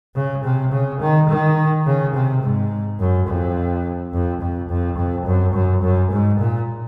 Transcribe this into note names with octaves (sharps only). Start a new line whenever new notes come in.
C#3
C3
C#3
D#3
D#3
C#3
C3
G#2
F#2
F2
F2
F2
F2
F2
F#2
F#2
F#2
G#2
A#2